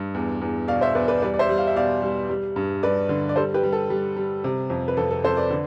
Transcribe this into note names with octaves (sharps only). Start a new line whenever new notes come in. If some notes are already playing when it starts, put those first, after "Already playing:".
Already playing: G2
E2
E2
B2 D5 F5
C5 E5
E2 B4 D5
B4 D5
G3 B4 D5
D5
C5 E5
G3
F5
E5
B2 D5 F5
G3
G3
G2
G2 B4 D5
D3
D5
G3 A4 C5
G4 B4
G3
A4
G3
G3
C3
F2
B4
F2 A4
A4
F2 A4 C5
B4 D5
D3